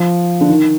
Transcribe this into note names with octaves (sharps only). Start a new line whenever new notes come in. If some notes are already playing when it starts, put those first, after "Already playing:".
Already playing: F3
D3
D#3